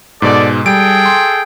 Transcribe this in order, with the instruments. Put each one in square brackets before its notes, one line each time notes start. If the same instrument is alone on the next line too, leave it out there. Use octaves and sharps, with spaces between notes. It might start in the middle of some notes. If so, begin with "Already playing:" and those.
[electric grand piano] G#2 B2 G#3 [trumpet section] A4 D5
[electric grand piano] G3 D7 [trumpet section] G#4 A4 G5
[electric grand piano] C6